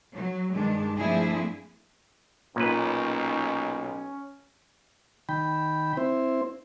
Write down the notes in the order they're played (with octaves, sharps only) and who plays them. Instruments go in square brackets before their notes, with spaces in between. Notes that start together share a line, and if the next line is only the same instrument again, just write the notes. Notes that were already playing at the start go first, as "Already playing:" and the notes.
[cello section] F#3
G2 D#3 G#3 D4
F3 A3 C4 D4 E4 G#4
[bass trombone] B1 [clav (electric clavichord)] A#2 B4 [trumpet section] C#4 [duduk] D#4
[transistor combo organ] D#3 G5 B5
C4 E4 C5